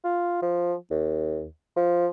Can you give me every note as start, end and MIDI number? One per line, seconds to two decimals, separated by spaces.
0.04 0.37 65
0.42 0.74 53
0.90 1.45 39
1.77 2.07 53